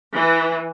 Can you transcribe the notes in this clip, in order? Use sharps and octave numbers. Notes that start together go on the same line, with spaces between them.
E3